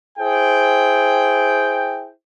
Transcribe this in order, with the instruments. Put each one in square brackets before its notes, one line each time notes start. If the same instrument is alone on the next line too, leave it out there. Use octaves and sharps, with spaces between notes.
[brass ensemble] E4 G#4 C5 G5